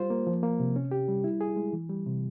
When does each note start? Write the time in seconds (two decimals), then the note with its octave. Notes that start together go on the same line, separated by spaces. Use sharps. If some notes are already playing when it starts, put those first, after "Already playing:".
Already playing: G3 F4 C5
0.10 A#3
0.27 F3
0.43 A#3
0.60 C3
0.76 C#4
0.91 G4
1.08 G3
1.24 E4
1.41 G#4
1.56 G#3
1.73 E3
1.90 G3
2.06 C3